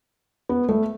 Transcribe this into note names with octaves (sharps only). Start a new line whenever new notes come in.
B3
A3